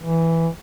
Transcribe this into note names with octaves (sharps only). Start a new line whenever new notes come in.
E3